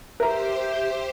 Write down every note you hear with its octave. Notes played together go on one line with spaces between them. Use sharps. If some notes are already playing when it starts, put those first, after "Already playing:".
G4 A#4 C5 E5 A#5